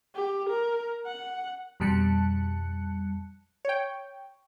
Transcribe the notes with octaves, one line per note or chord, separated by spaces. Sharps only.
G4
A#4
F#5
F2 B2 G3 A5 F#6 C#7
C#5 G5